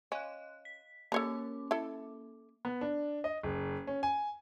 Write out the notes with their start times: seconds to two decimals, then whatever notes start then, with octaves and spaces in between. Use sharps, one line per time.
0.12 C#4 D#5 F5 F#6
0.65 B6
1.12 A#3 C#4 A4 C#5 A#5 D6
1.71 E4 A4
2.65 B3
2.81 D4
3.24 D#5
3.43 F#1
3.87 C#4
4.03 G#5